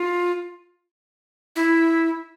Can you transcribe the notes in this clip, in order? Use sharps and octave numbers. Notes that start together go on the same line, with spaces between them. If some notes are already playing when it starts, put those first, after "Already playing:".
Already playing: F4
E4